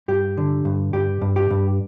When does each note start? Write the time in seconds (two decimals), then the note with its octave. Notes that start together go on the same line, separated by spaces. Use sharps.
0.08 G2 G4
0.37 D3
0.65 G2
0.93 G2 G4
1.21 G2
1.36 G4
1.50 G2